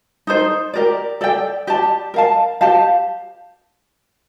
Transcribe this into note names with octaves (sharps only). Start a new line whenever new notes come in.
D#4 A4 C5
G4 A#4 D5
A4 D5 G5
G4 D5 A5
A#4 F5 A5
G4 C5 F5 A5